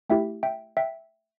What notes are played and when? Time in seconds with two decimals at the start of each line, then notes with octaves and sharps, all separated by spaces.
0.10 A3 E4 G4 E5 G5
0.43 E5 G5
0.77 E5 G5